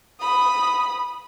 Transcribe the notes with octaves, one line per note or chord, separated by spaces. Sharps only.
B5 D#6